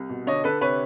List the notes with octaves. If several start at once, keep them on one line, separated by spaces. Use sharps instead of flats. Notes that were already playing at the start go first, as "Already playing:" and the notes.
Already playing: C2
B2
D3 C#5 D#5
D3 A4 B4
C3 B4 C#5